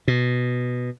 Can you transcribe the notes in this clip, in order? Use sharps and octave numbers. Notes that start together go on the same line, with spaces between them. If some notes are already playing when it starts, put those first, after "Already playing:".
B2